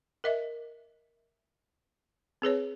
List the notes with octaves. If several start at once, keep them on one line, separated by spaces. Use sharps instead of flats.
A#4 D#5 E5
C4 G#4 B4 C#5